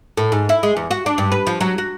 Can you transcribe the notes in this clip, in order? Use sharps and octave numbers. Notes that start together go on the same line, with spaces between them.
A2
G#2
E4
G#3
E2
F#4
D4
G2
B4
F3
F#3
F#4